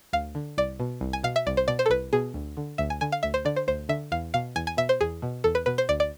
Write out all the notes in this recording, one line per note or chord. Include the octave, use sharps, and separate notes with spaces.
D2 F5
D3
C2 D5
B2
C2
G#5
B2 F5
E5
C2 D5
C5
B2 D5
C5
A4
C2 B4
B2 G#4
D2
D3
D2 E5
G#5
D3 G#5
F5
D2 E5
C5
D3 D5
C5
D2 C5
D3 E5
E2 F5
B2 F5
E2 G#5
G#5
B2 E5
C5
E2 G#4
B2
E2 A4
B4
B2 B4
C5
D2 D5
D5